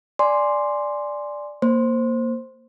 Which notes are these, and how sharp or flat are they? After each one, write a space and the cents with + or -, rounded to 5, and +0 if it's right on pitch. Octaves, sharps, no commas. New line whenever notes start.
D5 +0 G#5 +0 C6 +0
A#3 +0 C5 +5